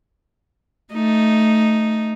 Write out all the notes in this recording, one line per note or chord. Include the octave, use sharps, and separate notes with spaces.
A3 D#4